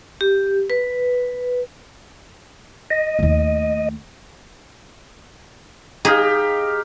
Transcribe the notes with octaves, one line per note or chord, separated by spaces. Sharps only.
G4
B4
D#5
D#2 A3
D#4 G4 G#4 F5